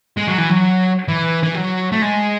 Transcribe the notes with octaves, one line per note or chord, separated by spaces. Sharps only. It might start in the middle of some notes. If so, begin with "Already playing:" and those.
G#3
F#3
E3
F#3
E3
E3
F#3
A3
G#3